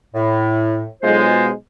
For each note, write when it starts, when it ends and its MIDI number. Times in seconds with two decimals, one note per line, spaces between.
0.15 0.86 45
1.02 1.50 35
1.02 1.50 56
1.02 1.49 65
1.02 1.49 72